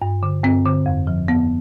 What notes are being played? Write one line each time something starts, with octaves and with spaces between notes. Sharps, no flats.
G2
D3
G2 C4
D3
F2
F3
F2 B3